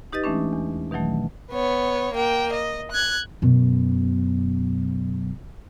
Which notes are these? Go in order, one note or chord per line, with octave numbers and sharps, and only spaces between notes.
D#4 G4 B4 D#5 A6
E3 G#3 A3 C#4 D4
E2
B2 D#3 E3 F#3 A3
B3 C#5
A#3 G5
D#5
F#6 G#6
F#2 B2